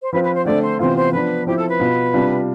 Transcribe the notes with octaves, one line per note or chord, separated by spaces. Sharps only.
C5
F3 C4 F4 B4
B4
C5
D3 A3 C4 D5
C5
C3 E3 B3 F4 C5
C5
F3 B3 D4 B4
F3 C4 E4 G4
A4
B4
B2 B3 F4
C3 G3 D4 F4